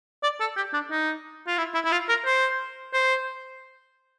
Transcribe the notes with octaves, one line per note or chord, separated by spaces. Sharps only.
D5
A4
G4
D4
D#4
F4
E4
E4
E4
F4
A#4
C5
C5